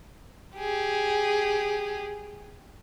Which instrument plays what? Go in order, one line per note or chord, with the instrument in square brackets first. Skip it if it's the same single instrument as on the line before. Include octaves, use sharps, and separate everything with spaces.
[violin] G4 G#4